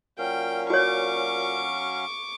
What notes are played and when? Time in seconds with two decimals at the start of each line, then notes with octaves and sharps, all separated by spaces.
0.18 A#2 F#3 C#4 F5 G5
0.70 F#4 C#5 C#6 D6